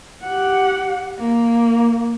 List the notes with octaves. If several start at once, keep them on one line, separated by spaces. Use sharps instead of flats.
G4 F#5
A#3